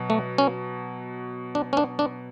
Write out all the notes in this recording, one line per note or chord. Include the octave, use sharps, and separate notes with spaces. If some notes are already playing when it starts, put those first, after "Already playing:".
Already playing: B2 F#3
A3
C#4
D4
C#4
D4
D4